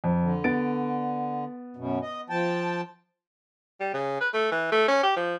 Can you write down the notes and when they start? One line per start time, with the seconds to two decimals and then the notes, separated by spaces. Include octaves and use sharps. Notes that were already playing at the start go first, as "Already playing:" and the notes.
0.04 F2
0.20 D3
0.44 B3 A6 D7
1.77 F#2 B2
2.02 D#5
2.30 F3 G5 A5
3.80 G3
3.94 C#3
4.21 B4
4.34 A3
4.52 E3
4.72 A3
4.88 C#4
5.03 G4
5.16 F3